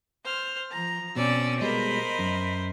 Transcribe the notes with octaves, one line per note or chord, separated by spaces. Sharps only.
C5 F6
F3 A#5
B2 C4 C#4 D5 E6
B2 G3 G#3 A#4 C5 D#5 B5
F#2